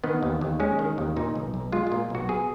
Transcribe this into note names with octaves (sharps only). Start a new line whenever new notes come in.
D#3 B3
D#2
D#2
G#3 C#4
D#3
D#2
A#2 D#4
B1
B1
G#3 F4
A#2 F4
B1 F#4
B2 G#4